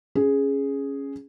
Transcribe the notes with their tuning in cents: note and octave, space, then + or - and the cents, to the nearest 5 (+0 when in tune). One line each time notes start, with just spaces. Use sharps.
C#4 +0 G#4 +0